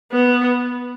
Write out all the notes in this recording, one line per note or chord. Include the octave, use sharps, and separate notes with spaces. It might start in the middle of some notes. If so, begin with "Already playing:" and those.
B3